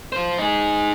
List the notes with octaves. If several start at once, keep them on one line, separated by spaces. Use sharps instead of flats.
F4 C5
D#4 G#4